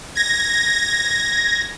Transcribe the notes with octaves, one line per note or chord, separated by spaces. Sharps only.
G#6 A#6